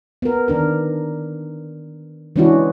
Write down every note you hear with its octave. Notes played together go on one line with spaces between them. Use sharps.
B3 A#4
D#3 D4 A#4
E3 G#3 C#4 D4 E4 F#4